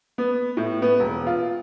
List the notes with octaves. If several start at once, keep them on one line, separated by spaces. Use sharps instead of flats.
B3
A2
B3
E1
F4